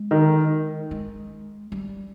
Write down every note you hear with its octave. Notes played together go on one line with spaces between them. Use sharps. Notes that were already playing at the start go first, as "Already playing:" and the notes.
Already playing: G#3
D#3
G#3
G3